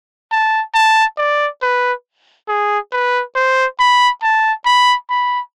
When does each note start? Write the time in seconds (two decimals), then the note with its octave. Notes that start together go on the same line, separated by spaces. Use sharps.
0.32 A5
0.74 A5
1.18 D5
1.62 B4
2.48 G#4
2.92 B4
3.35 C5
3.79 B5
4.22 A5
4.65 B5
5.10 B5